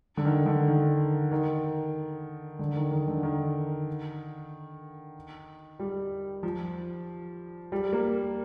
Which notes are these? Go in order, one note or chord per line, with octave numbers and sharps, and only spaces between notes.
D3
D#3
D3
D#3
D#3
D3
D#3
D#3
D3
D#3
G3
F3
G3
A#3